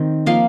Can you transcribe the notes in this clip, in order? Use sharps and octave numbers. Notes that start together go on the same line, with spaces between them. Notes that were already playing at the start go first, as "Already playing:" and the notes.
Already playing: D#3 C4
F3 A#3 F5